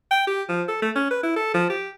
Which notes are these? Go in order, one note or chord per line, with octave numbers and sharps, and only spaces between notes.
G5
G4
F3
A4
A3
C#4
B4
E4
A4
F3
G4